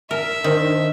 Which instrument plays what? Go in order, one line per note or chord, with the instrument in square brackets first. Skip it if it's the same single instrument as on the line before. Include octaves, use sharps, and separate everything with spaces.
[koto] A#4 [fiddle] E5
[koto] D#3 [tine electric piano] D4 C5 D#5